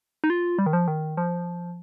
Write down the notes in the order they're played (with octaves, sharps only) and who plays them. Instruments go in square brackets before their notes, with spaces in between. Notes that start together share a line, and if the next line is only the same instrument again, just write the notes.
[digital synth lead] D#4
F4
G3
D#3
F3
D#3
F3